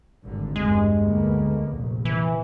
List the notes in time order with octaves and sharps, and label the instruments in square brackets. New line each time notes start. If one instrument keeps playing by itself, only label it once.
[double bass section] G#1 G2 D3
[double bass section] E2 G2 [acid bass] G#3
[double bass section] D2 A#3 B3
F1 A#1
[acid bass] E3